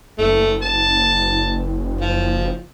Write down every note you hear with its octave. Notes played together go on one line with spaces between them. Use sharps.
F#1 A3
A5
F3